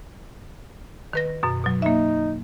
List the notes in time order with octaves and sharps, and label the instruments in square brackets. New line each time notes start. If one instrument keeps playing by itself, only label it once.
[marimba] D#3 B4 A#6
F#2 B2
B2 F#3
[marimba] A#3 E5 [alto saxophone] D#4